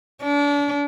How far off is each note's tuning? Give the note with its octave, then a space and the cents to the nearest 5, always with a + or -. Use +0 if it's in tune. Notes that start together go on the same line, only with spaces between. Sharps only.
D4 -35